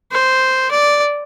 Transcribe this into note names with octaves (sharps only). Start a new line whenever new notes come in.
C5
D5